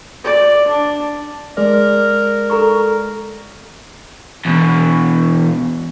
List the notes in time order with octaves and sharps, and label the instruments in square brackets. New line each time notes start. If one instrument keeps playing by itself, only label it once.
[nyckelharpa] D5
D4
[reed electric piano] G#3 D5 [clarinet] A#4
[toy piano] A4 A#5 C#6
[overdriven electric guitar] E2 B2